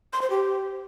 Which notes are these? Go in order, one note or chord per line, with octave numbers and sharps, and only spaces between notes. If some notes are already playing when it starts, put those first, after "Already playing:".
C6
C5
G4